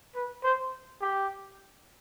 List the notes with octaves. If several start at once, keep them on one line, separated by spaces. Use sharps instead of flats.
B4
C5
G4